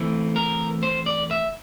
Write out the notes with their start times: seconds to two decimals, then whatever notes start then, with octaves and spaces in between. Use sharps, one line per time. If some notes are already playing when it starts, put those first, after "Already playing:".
Already playing: E3 A3 C4
0.36 A#4
0.83 C5
1.06 D5
1.31 E5